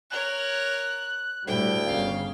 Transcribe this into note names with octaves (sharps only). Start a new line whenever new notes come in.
A#4 C#5 F#6
D2 A2 G3 G5
G1 C#3 F5